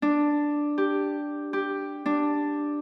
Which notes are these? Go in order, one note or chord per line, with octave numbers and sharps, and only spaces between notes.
D4
G4
G4
D4